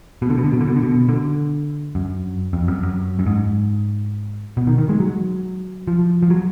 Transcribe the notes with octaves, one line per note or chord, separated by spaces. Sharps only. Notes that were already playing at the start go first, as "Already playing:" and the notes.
B2
D3
B2
D3
B2
D3
B2
D3
B2
D3
F#2
F2
F#2
F#2
F#2
G#2
B2
D#3
D#3
G#3
F#3
F3
F3
F#3